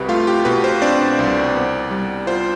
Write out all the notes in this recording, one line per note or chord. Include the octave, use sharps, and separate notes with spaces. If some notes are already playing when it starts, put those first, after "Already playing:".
Already playing: C2 B2 C4 G4 B4 B5
A3 F4 F5
G4 G5
B2 B4
C5
C4 D4 D5
C2
B3
G3
F4 C5